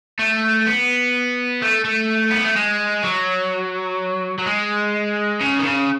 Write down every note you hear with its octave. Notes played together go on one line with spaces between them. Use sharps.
A3
B3
A3
A3
B3
A3
G#3
F#3
F#3
G#3
C#3
D#3
C#3